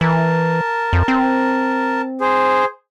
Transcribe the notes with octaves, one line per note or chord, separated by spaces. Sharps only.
E3 A#4 A5
F2
C4
G#4 C5